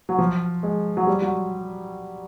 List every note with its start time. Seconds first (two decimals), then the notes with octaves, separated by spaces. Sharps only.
0.09 F#3
0.19 F3
0.63 G#3
0.97 F#3
1.07 G3
1.22 F#3